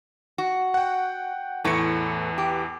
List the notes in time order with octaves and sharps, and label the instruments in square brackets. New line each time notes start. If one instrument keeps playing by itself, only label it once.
[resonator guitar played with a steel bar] F#4
[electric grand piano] F#5 G5
[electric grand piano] E2 E3 C#7 [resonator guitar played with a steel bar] A2 A3
[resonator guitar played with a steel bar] G4